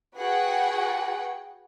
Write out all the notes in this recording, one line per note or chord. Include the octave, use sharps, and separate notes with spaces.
F#4 G#4 B4 F#5 G5